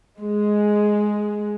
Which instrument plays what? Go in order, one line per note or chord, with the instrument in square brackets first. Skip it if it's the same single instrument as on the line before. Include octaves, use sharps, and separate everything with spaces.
[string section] G#3